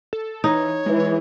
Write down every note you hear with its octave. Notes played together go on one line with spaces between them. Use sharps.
A4
E3 D#4 C#5
E3 G#3